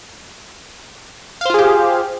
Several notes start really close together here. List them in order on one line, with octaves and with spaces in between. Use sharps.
F5 C5 F4 G#4 G4